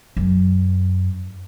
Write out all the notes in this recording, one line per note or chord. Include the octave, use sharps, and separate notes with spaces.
F#2